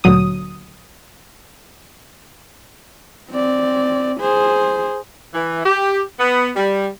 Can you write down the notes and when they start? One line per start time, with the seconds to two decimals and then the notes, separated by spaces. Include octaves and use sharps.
0.04 D2 A#2 F#3 D#6
3.30 C4 D5
4.20 G#4 C5
5.34 E3
5.64 G4
6.19 B3
6.56 G3